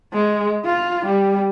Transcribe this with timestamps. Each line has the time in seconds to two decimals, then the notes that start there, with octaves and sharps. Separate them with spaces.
0.13 G#3
0.65 F4
1.05 G3